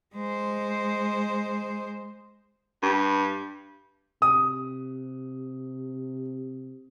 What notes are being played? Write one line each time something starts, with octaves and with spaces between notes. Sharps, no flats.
G#3 C5
G2
C3 D#6